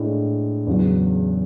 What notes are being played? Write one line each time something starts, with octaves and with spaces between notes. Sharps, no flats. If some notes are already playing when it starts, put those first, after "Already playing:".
Already playing: A2 G#3 D4
E2 C#3 F#3